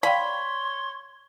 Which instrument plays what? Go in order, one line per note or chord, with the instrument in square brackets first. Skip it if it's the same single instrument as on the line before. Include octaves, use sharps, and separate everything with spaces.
[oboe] C#5 [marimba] D5 F5 G5 [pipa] B5 [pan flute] C6